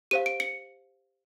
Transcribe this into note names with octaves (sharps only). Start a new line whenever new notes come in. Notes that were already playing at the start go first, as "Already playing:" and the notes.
G4 C5 F5 D#7
D7
C#7